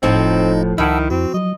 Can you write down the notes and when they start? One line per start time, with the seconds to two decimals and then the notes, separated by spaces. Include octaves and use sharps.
0.03 F1 A2 F3 C4 D#4 D#5
0.78 C#2 D#3 E4 F#5 A5 E6
1.10 F2 C4 F#4
1.34 F#3 D#5